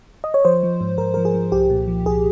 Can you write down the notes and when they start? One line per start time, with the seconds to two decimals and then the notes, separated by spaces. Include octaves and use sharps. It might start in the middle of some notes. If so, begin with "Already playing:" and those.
0.24 D#5
0.34 C#5
0.45 F3 C5
0.63 F3
0.81 G#2
0.98 G#2 A#4
1.14 F3 A#4
1.25 G#4
1.34 F3
1.52 C2 G4
1.70 A#2
1.87 F3
2.06 C2 G#4